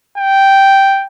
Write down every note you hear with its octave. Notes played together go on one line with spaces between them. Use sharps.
G5